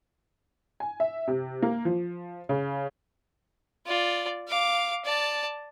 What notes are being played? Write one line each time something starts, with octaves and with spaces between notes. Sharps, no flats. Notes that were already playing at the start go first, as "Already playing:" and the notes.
G#5
E5
C3
A#3
F3
C#3
F4 D5
F5 D6
D5 A5